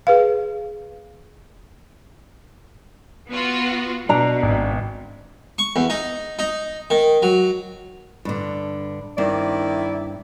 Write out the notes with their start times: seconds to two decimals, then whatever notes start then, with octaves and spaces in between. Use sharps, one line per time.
0.07 G#4 B4 F5
3.29 B3 F4 F#4
4.09 B2 D4 A#5
4.43 G#1
5.58 C#6
5.76 E2
5.90 D#4
6.39 D#4
6.90 D#3
7.23 F#3
8.25 G2 D3
9.18 G2 D#3 C4 E4 D5